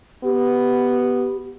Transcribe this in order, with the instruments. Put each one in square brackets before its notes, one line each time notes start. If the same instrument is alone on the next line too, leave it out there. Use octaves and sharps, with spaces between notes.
[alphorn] B3 [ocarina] G4